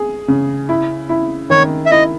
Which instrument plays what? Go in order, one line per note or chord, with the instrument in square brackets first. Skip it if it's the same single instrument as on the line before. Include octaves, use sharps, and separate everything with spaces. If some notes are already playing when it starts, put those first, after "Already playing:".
Already playing: [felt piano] G#4
C#3
E4
E4
[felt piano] D#3 [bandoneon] C#5
[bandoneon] E5
[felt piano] E4 [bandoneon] D#5